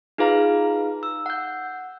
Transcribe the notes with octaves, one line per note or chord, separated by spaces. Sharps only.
D#4 F4 G#4 B4 F5 A#5
E6
F#5 G6